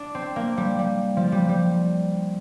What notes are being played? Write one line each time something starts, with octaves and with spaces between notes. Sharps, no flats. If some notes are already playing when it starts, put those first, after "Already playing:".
Already playing: D4
C4
A#3
G3
G3
F3
G3
G3